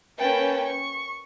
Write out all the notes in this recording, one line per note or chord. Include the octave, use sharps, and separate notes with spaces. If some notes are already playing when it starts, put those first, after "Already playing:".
A#3 C#4 B4 G5 A5
C#6